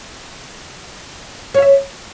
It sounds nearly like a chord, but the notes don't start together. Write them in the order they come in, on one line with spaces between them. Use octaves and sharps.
C#5 F5 E5